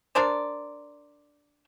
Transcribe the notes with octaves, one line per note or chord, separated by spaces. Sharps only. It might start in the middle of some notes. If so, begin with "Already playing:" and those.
D4 A#4 C5 D5